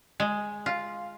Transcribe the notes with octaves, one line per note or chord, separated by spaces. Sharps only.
G#3
F4